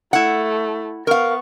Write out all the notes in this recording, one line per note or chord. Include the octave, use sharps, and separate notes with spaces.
A3 E4 F#5
B3 A#4 F5 C#6